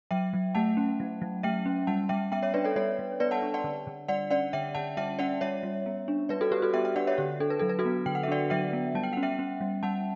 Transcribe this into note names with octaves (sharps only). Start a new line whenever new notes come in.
F#3 E5 G5
F#3
A3 F#5 A5
C#4
F#3
F#3
A3 E5 G5
C#4
G3 F#5 A5
G3 E5 G5
B3 E5 G5
C#5 E5
D4 B4 D5
A4 C#5
G3 A4 C#5
G3
B3 B4 D5
F#5 A5
D4
D5 F#5
D3
D3
G3 D5 F#5
C#4 D5 F#5
D3 E5 G5
D3 F#5 A5
G3 E5 G5
C#4 D5 F#5
G3 C#5 E5
G3
B3
D4
G3 B4 D5
F#4 A4
G3 G4 B4
F#4 A4
B3 E5 G5
E5 G5
D4 D5 F#5
C#5 E5
D3 G4
D4 A4
B4
F#3 A4
B4
F#4 A4
B3
D3 G5
F#5
E5
D4 D5 F#5
F#3 E5 G5
B3
G3 A5
G5
F#5
C#4
E5 G5
C#4
G3
G3 F#5 A5